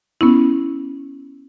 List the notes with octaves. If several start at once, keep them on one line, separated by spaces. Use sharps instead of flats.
B3 C#4 E4